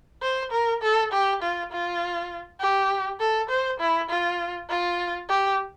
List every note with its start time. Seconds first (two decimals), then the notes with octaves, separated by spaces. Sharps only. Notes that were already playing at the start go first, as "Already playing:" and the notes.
0.22 C5
0.52 A#4
0.82 A4
1.12 G4
1.42 F4
1.72 F4
2.60 G4
3.20 A4
3.50 C5
3.80 E4
4.10 F4
4.69 F4
5.29 G4